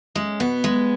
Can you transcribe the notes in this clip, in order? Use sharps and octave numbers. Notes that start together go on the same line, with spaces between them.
G#3 C#4
B2 B3
G#3